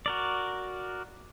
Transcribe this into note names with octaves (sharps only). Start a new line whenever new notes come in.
F#4 A#4 D5